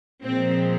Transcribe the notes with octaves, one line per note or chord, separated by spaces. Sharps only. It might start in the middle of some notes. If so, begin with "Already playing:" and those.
A#2 F3 G#3 C4